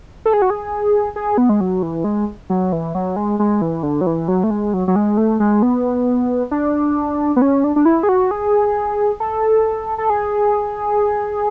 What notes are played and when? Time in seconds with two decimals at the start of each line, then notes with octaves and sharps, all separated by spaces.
0.25 A4
0.33 G#4
0.42 F#4
0.50 G#4
1.16 G#4
1.38 B3
1.49 G#3
1.61 F#3
1.83 E3
2.04 G#3
2.50 F#3
2.72 E3
2.95 F#3
3.16 G#3
3.39 G#3
3.62 E3
3.83 D3
4.01 F#3
4.07 E3
4.28 F#3
4.44 A3
4.51 G#3
4.74 F#3
4.88 F#3
4.96 G#3
5.17 A3
5.40 G#3
5.62 B3
6.51 D4
7.36 B3
7.42 C#4
7.64 D4
7.76 D4
7.85 E4
8.03 G#4
8.09 F#4
8.31 G#4
9.20 A4
9.98 A4
10.10 G#4